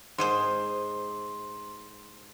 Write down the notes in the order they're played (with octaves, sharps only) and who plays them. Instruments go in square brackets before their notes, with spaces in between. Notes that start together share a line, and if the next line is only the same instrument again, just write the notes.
[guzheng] G#2 G#4 C5 [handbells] C6